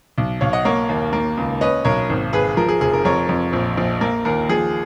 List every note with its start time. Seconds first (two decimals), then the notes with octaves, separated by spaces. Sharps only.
0.18 B1
0.41 B1 C#5 F5
0.53 D#5 F#5
0.65 A#3 C#5 F5
0.89 D#2
1.13 A#3
1.37 C#2
1.61 C#4 B4 D#5
1.85 B1 A#4 C#5
2.09 G#1
2.33 G#1 G#4 B4
2.57 F3 A#4
2.69 G#4
2.81 F1 G#4
2.93 A#4
3.05 F2 A#4 C#5
3.29 F2
3.53 A#1
3.77 A#1
4.01 A#3
4.25 D#2 A#4
4.49 F3 G#4